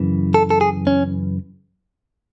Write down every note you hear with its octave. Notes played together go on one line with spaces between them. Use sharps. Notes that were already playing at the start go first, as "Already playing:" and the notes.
Already playing: F#2 C#3 E3
A4
A4
G#4
C#4